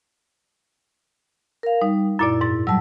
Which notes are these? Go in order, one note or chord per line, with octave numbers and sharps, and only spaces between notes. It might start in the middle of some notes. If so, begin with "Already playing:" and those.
A#4 F5
G3 D#4
F#2 A#2 E4 D5
G#2 A6
F#3 G3 A5 E6